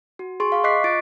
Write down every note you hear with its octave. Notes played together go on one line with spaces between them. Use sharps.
F#4
G#4 C6 C#6
F5 C#6
D#5 C#6 D6 F#6 B6 C7
F4 A6 D7